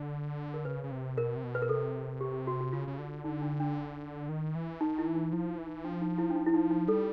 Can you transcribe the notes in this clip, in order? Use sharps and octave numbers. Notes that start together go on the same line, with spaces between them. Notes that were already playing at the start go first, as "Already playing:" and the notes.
Already playing: D3
A#4
C#3 B4
C#3
C3
B2 A#4
C3
B2
B4
A#4
C3 A4
G4
G4
F#4
F#4
C#3 F4
C#3
D3
D3 D#4
D4
D4
D#3
E3
D#3 D#4
E4
E3
D#4
F3 E4
E3
D#4
F3 D4
D#4
E4
D4
D#4
E4
D#4
D#4
G3 A4